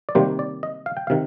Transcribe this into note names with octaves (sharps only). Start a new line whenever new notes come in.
D5
C3 D#3 G3 A#3 C5
D5
D#5
F5
G5
C3 D#3 F5